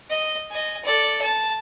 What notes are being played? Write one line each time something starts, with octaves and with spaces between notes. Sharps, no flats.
D#5
D#5 G#5
A4 D5
A5